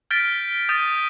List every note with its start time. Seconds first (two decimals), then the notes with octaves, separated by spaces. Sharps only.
0.11 F6 G6 A6 B6 D7
0.69 D#6 G6 A6 D#7